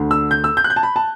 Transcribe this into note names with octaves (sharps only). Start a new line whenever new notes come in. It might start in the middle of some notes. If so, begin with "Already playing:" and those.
Already playing: D2 D3
E6
G6
E6
G6
F#6
G6
A5
B5
A5